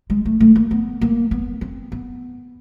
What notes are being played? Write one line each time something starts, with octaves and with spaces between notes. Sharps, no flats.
G#3
A3
A3
A#3
B3
A#3
B3
C4
B3